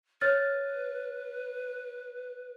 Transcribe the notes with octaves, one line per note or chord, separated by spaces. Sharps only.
B4 C#5 F6 A6